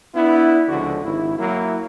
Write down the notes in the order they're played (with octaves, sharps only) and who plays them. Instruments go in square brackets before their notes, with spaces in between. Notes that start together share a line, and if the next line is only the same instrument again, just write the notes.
[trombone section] B3 D4 E4
C#2 D3 F3 F#4
G#1 E4
F#3 A#3 E4